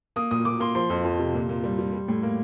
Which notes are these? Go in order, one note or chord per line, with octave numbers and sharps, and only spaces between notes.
A#3 D#6
A#2 D#6
A#2 D6
A#3 C6
F3 C6
F2
F2
C3
A#2
A#2
G3
G3
G3
A2
A#3